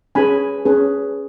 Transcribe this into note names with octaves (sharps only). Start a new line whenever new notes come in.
C#4 G#4 B4 G#5 B5
C#4 G#4 B4